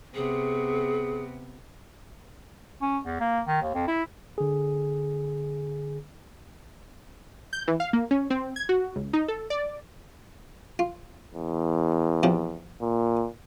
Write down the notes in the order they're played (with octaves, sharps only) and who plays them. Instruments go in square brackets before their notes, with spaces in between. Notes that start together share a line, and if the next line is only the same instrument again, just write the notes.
[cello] C3 B3 [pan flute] G#4
[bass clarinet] C#4
E2
A#3
D#3
D#2
F2
E4
[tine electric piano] D3 G#4
[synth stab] G6
E3
F5
A#3
C#4
C4
G#6
F#4
C#2
D#4
A4
D5
[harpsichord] F4
[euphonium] E2
[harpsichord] C3 F3 G4
[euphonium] A#2